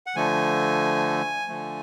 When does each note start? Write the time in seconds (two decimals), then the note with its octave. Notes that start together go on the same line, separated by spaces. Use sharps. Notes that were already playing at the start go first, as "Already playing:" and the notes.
0.06 F#5
0.15 D3 F3 A3 G#5
1.48 D3 F3 A3